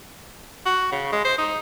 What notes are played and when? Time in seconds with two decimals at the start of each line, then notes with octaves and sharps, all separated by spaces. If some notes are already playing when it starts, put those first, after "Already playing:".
0.66 F#4
0.92 C#3
1.13 G#3
1.25 C5
1.38 D#4